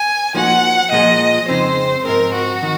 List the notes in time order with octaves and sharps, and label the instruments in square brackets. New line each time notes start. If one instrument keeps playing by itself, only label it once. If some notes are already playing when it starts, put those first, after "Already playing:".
Already playing: [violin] G#5
[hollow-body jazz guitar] F3 A#3 D#4 F#4 [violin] F#5
[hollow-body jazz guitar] A#2 F3 G#3 [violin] D#5
[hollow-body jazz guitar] F2 C#3 G#3 C4 D#4 [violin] C5
[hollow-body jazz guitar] G#2 F3 C4 [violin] A#4
[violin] F#4
[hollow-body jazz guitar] D#3